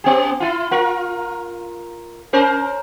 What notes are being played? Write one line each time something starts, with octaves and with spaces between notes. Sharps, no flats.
B3 G4
E4 F4
F4 A#4
C#4 A#4 C5